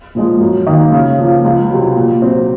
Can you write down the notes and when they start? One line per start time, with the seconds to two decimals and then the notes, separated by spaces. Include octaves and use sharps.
0.15 A#2 F3 G#3
0.40 F#2
0.67 D#3 A#3
0.92 C#3
1.18 F3 A#3
1.44 C#2
1.70 C3 F#3
1.96 A#2
2.22 F#3 C4